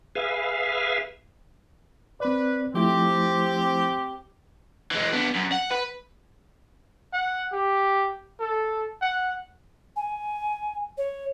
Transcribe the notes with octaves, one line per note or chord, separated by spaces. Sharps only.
G#4 B4 E5 F5
C4 B4 D5
F3 A3 C4 E4 G4
E3 G#3
B3 D4
F#2
F#5
B4
F#5
G4
A4
F#5
G#5
C#5